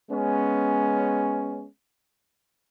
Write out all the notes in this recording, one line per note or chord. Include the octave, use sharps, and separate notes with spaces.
G#3 B3 C#4